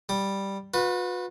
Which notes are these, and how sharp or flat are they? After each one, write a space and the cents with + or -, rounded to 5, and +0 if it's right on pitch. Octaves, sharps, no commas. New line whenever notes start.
G3 +0 D#6 -45
F#4 -45 B4 +0